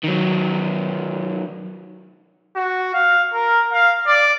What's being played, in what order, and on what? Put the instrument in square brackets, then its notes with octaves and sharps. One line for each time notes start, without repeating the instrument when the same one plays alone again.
[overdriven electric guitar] D#3 F#3
[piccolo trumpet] F#4
F5
A#4
F5
D5